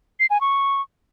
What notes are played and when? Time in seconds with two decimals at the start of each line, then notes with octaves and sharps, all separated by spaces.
0.20 C7
0.30 G#5
0.41 C#6